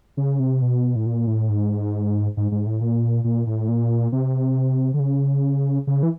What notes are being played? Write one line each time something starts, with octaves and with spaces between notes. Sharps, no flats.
C#3
C3
B2
A2
A#2
A2
G#2
G#2
G#2
A2
A#2
A#2
A2
A#2
C3
D3
C#3
C#3
E3